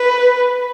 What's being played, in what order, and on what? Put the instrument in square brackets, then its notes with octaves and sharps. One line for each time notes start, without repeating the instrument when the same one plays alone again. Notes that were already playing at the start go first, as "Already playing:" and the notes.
Already playing: [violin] B4